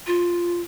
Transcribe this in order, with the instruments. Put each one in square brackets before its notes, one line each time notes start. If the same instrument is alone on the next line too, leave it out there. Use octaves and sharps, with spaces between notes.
[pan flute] F4